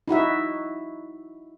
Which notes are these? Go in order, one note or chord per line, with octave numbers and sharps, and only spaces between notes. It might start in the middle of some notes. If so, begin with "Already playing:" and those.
D#4 E4 F#4 E5